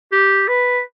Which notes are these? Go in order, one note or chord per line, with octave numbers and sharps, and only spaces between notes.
G4
B4